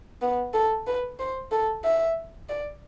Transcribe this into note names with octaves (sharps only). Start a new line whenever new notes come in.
B3
A4
B4
C5
A4
E5
D5